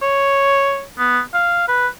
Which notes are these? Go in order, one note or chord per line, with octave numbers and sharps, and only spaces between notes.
C#5
B3
F5
B4